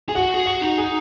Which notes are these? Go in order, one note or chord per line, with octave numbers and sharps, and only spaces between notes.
G#4 G#5
F#4 F#5
G#4
F#4 F#5
D#4
G#4